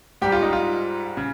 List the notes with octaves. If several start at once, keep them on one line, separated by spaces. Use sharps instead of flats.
G#2 G3 G4
F4
D#4
F4
C#3